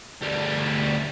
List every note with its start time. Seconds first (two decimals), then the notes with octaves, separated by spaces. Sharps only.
0.22 D2 G3